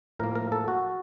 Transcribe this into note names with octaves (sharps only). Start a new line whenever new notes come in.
A2 F3 A#3 A#4
A#4
A4
F#4